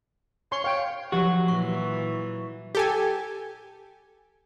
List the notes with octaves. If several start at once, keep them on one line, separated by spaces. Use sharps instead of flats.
C#5 C6
C#5 F5 G5
F3 F#3 F#4 G4
A#2 E3 C#6
G4 A4 G#5